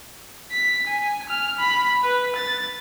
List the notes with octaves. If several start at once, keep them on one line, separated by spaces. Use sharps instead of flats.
B6
G#5
F6
B5
B4
A6